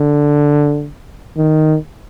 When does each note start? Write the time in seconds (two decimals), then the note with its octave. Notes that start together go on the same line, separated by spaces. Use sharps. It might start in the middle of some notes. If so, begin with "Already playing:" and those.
Already playing: D3
1.37 D#3